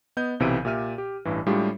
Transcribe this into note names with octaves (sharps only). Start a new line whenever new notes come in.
B3 D#5 G6
B1 C3 E3 F#3 D7 D#7
A#2 G4 E5 F6 D#7
G4
A1 G2 E3
A2 G3 G#3 D4 F4 G4